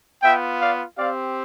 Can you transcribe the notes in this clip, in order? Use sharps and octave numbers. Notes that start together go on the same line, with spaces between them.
B3 F4 E5 G5
D5 F5
C4 G4 D5 F5